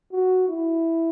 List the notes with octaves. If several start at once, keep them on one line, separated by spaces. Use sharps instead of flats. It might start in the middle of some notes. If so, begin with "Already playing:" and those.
F#4
E4